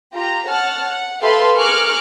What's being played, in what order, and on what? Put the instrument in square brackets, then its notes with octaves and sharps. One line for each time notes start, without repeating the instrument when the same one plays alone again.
[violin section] F4 G4 A#5
C#5 F#5 A5 F6
F#5
G4 A4 B4 E5 F5 C6
G#4 A#4 C#6 D6 F6 F#6